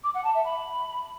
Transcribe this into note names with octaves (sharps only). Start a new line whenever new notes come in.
D6
F#5
A5
E5
B5